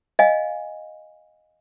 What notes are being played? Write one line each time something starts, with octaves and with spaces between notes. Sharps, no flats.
D#5 F5 G#5